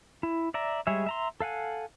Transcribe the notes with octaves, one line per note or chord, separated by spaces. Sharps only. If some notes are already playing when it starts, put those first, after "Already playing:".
E4
D5 E5 A#5
G3 G#3 G#4 C#5 E5
E5 A#5 C6
A4 F5 F#5 G#5